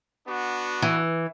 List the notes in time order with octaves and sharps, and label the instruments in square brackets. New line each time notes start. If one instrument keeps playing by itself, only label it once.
[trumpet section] B3 D4 F#4
[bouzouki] E3